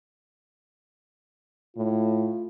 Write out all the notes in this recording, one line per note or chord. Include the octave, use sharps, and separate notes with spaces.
A2 F4